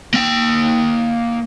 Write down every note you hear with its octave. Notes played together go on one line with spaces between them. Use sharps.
A#3 G5